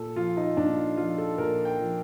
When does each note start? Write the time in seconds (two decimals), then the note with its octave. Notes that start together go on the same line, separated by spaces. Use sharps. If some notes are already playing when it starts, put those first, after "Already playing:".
Already playing: A#2 A4
0.16 F3 F4
0.37 D#4
0.57 A#2 D4
0.77 F4
0.97 F3 F4
1.18 A4
1.38 A#2 A#4
1.65 G5
1.79 F3